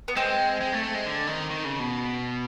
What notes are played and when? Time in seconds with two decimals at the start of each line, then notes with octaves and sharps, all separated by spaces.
0.08 B3
0.16 G#3 C4
0.61 G#3
0.72 A3
0.83 A3
0.94 G#3
1.06 D3
1.27 D#3
1.51 D#3
1.65 C#3
1.80 B2